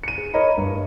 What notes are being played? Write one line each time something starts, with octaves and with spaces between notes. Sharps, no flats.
C#7 D#7
G#4
A#4 C#5 D#5 A#5 B5
G2